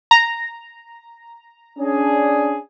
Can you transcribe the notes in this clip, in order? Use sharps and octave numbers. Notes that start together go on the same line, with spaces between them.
A#5
C#4 D4 G#4